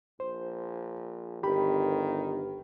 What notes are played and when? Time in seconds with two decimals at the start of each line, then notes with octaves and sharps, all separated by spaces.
0.20 A#1 C5
1.43 G1 D#3 G4 B5